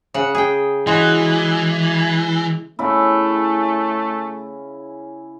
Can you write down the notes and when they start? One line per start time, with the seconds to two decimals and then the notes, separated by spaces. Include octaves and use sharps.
0.14 C#3 F#5
0.35 G#4 G5
0.87 E3 G#3 F#4
2.79 C#3 A3 E4